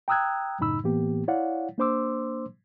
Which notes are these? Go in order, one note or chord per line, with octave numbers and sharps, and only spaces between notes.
G5 A#5 D#6 E6 F#6 G#6
F#2 A2 C#3 D#4 B5 E6
A2 E3 A#3 B3 G4
E4 C#5 D5 F5 F#5
A#3 D4 C5 C6 D6 E6